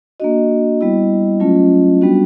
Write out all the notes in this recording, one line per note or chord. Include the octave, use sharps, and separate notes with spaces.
A#3 D4 F#4 D#5
G3 B3 E4
F#3 A3 C#4 F4
G3 B3 D4 F#4